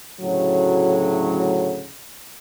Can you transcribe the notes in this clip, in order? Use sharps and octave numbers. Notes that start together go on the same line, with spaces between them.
D2 A2 C#3 F#3